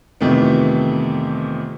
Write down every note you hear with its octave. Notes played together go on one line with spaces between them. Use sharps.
F2 C3 D#3 E3 A3 B3